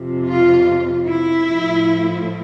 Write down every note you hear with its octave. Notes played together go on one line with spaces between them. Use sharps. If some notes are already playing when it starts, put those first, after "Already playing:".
Already playing: F2 C3 F3
F4
E4
A2 F3